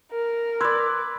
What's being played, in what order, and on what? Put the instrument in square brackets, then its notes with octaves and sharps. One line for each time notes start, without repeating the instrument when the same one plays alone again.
[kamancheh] A#4
[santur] B4 D5 [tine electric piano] C6 E6 G#6